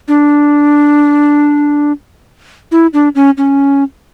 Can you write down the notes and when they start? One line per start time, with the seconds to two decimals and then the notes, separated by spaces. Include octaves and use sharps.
0.08 D4
2.72 E4
2.93 D4
3.15 C#4
3.38 C#4